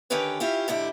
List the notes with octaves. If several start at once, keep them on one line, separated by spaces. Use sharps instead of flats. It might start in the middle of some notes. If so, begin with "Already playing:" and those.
D3 D#3 C#4 G4 B4 C#5
C#4 E4 F4 G4
G#2 D3 E4 G4